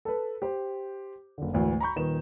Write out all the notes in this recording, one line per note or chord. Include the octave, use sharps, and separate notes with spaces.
A4 B4
G4 C5
F#1 D3
G#1 D2 E3
A#5 B5 C#6 G6
D#1 D#3 B4 E7